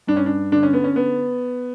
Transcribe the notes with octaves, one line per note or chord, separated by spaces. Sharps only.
G2 D4
C#4
D4
D3 D4
C#4
B3
C#4
B3